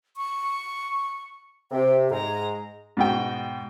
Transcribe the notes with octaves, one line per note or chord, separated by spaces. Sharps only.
C#6
C3 G5
G#2 G#3 A#5
G#2 B2 G5